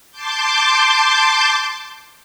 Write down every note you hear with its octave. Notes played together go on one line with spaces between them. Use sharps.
A5 C6 D6 G6